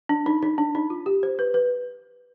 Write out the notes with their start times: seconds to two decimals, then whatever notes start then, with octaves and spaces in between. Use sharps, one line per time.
0.09 D4
0.26 D#4
0.43 D#4
0.58 D4
0.75 D#4
0.90 F4
1.06 G4
1.23 C5
1.39 B4
1.54 B4